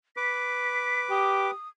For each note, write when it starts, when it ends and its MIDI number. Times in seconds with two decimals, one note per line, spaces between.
0.17 1.51 71
0.17 1.51 86
0.17 1.02 95
1.10 1.50 67
1.10 1.68 87